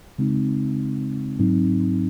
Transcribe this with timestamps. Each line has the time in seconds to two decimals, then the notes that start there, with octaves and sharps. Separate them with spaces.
0.19 C#3 G#3 C4 D#4
1.39 G#2 F#3 C4 D#4